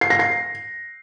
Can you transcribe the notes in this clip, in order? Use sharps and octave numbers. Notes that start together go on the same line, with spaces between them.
C7
A#6
C7